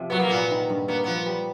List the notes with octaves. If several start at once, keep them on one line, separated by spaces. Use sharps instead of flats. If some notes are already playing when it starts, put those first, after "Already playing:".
Already playing: C3 F3
F#3 B3
A#3
A#2 B3
D#3
G2
A#3 B3
F3 B3
G3